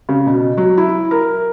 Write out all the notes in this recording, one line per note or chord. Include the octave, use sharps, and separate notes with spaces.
C#3
B2
F#3
E4
A#4